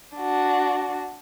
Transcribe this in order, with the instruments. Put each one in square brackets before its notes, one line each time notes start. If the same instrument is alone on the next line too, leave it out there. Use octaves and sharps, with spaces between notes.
[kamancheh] D4 F#4